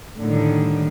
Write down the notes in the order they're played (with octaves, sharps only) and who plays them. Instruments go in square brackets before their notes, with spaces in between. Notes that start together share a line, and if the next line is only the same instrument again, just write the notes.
[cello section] A2 D3 D#3 G3